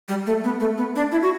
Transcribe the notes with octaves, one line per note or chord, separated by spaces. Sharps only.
G3
A3
B3
A3
B3
D4
E4
F#4